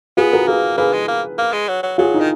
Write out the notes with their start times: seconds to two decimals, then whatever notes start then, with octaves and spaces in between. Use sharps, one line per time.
0.17 B3 F4 G#4
0.33 F#4 A#4
0.47 A#3 G#4 B4
0.78 A#3 G#4 B4
0.93 G#3
1.08 A#3
1.39 A#3
1.53 G#3
1.68 F#3
1.83 F#3
1.98 F#3 F4 G#4
2.14 D#4
2.20 D#3